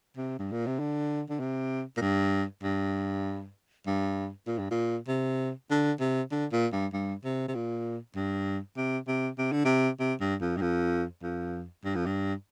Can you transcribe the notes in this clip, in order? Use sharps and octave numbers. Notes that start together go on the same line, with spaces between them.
C3
G2
A#2
C3
D3
D3
C3
A#2
G2
G2
G2
A#2
G2
A#2
C3
D3
C3
D3
A#2
G2
G2
C3
C3
A#2
G2
C3
C3
C3
D3
C3
C3
G2
F2
G2
F2
F2
G2
F2
G2